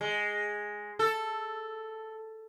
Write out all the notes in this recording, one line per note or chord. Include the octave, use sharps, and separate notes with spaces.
G#3
A4